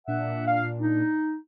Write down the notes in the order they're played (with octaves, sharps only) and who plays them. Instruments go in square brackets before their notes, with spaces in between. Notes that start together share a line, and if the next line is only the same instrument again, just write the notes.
[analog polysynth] A#2 D4 [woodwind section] E5 F#5
[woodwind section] F5
D#4